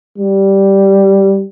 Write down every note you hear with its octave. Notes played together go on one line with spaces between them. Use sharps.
G3